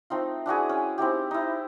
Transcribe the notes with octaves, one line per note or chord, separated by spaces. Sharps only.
A3 C4 D#4 F4
D4 E4 F#4 G#4
C#4 G#5
C4 D#4 E4 G4
D#4 E4